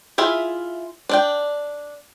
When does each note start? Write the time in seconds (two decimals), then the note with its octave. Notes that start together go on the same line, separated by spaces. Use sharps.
0.18 E4 F4 G#4 E5
1.09 D4 D5 G5